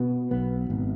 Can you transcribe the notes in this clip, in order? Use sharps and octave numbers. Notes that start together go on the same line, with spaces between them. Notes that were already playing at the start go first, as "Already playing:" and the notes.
Already playing: B2 B3
B1 B3
G#1